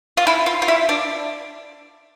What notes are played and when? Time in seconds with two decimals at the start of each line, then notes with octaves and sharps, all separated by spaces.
0.17 F4
0.27 E4
0.46 F4
0.62 F4
0.68 E4
0.89 D4